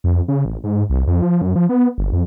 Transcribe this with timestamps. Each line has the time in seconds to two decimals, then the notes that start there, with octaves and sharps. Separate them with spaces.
0.04 F2
0.28 C#3
0.45 A1
0.64 G#2
0.90 C2
1.07 F2
1.22 F3
1.42 F#2
1.56 F3
1.69 B3
1.98 G1
2.13 F2